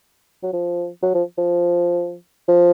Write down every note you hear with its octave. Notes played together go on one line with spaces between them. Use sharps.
F#3
F3
F#3
F3
F3
F3